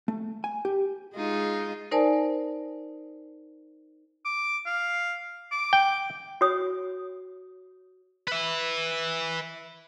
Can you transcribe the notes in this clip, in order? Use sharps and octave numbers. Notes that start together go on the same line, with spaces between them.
A3
G#5
G4
G#3 D#4 F4
D#4 A#4 C5 D5 G#5 A5
D6
F5
D6
G5
F#4 C#5 D#6
B4 E5